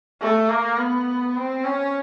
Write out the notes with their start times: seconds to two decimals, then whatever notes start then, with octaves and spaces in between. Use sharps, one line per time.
0.21 A3
0.49 A#3
0.78 B3
1.36 C4
1.64 C#4